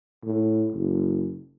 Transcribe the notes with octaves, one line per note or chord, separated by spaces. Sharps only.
A2
F#1